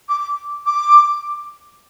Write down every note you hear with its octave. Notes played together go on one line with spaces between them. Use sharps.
D6
D6